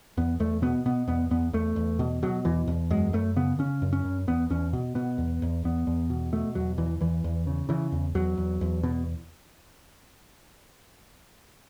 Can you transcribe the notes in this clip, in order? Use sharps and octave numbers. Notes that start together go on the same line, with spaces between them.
E2 B3
E2 A3
B2 B3
B2 B3
E2 B3
E2 B3
E2 A3
E2
B2
B2 F#3
E2 E3
E2
F#2 G#3
F#2 A3
C#3 B3
C#3 C#4
F#2
C#4
F#2
E2 B3
E2 C#4
B2
B2 B3
E2
E2
E2 B3
E2
B2
B2 A3
E2 F#3
E2 E3
E2 E3
E2
C#3
C#3 E3
E2
E2 F#3
E2
E2
B2